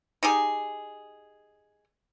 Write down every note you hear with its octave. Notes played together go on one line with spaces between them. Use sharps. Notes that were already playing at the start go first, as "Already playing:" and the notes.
D#4 G4 G#4